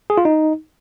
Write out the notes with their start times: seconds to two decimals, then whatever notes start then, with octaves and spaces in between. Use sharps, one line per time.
0.10 G#4
0.18 F4
0.25 D#4